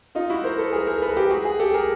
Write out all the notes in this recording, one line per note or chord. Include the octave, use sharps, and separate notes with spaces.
D#4 F4
E4 F#4
A#4 C5
A4 B4
G#4 A#4
A#4 C5
A#4
A4 B4
G4 A4
F#4 G#4
F#4 G#4
G4 A4
G#4 A#4